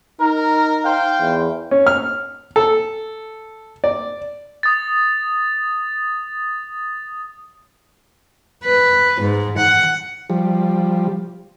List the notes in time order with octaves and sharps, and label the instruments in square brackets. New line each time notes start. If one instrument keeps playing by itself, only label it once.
[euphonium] D#4 [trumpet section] A#4
[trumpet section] C5 F5 G5
[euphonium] E2
[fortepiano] C#4
F6
A4
D5
[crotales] D#6 A6
[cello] B4
G#2
F#5
[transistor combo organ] F3 G3